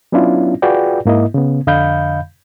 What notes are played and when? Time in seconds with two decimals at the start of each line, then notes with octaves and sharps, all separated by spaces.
0.12 F#3 B3 C#4 D4 E4 F4
0.62 F4 F#4 G#4 B4 D5 G5
1.05 G#2 A#3 E4 D#5
1.34 C#3 B3
1.67 F2 D3 D#5 F5 B5 G6